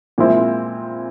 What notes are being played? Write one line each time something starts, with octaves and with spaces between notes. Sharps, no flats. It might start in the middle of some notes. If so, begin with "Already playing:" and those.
A#2 F3 G#3 C4 E4